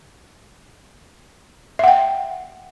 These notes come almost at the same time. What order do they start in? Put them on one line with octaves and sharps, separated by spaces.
E5 F#5 G5